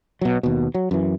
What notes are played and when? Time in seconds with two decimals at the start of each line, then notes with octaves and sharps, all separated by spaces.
0.21 B2 F#3
0.43 D#2 B2
0.75 F#3
0.91 F#2 E3